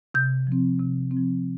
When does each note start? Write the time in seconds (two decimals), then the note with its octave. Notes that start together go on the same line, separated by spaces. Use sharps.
0.14 C3 G6
0.47 F3 C4
0.79 C3
1.11 C4
1.17 F3